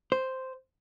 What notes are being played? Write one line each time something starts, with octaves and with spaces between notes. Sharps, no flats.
C5